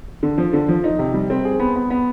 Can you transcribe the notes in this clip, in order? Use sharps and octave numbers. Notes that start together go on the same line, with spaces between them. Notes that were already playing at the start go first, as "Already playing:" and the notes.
D3
F3
D3
F3
D#4
C3
G3
C4
G#4
B3
B3
B3